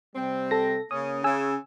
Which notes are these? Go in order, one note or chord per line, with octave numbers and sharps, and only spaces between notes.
C3 G3 C4
A4 A#6
C#3 A#3 C#4 D#6
C#3 G#5 E6